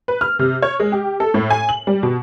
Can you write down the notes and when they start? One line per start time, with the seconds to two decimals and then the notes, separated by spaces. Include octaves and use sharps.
0.08 B4
0.21 F6
0.39 C3
0.62 C#5
0.80 G#3
0.92 G4
1.20 A4
1.34 A2
1.50 G#5
1.69 F#7
1.87 G3
2.03 B2